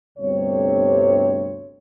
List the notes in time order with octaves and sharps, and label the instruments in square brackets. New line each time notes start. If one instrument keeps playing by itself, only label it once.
[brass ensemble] G1 D2 G2 C3 C4 C#5